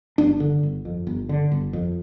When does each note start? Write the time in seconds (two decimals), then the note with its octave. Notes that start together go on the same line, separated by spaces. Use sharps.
0.18 G1 D4
0.40 D3
0.63 G1
0.85 F2
1.07 G1
1.29 D3
1.52 G1
1.73 F2